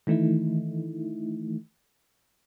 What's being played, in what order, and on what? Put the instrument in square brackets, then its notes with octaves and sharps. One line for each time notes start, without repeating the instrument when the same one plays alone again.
[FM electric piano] D#3 E3 A3 D#4 E4